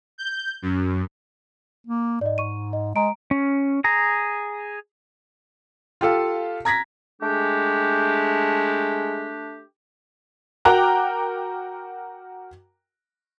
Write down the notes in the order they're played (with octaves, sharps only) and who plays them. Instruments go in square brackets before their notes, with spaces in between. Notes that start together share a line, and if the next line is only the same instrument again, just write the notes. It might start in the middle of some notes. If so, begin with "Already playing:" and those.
[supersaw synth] G6
F#2
[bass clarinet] A#3
[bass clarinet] G#2 [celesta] D5 D#5
[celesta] C#6 D#7
D#5
[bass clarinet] G#3 [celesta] A#5 D7
[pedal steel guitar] C#4
G#4 A#5
[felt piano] F4 G4 A4 F5
A#5 G#6 A#6 B6
[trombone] G#3 [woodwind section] A3 D4 G4
[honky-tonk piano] F#4 A#4 G5 A#5 D6 F#6